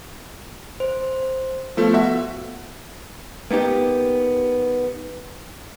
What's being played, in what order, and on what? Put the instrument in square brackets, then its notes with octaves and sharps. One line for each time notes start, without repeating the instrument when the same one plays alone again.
[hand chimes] C5
[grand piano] F3 A3 [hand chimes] B3
[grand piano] F#4 E5
[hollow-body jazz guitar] A#3 B3 D#4 G4